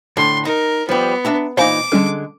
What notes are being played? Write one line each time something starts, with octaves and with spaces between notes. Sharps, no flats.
A2 D3 C6
D#4 A#4
F3 G3 B3
D4 E5 A#5
A#2 E3 D#4 C5 F5 G#5 D6
D3 G3 G#3 C#4 A4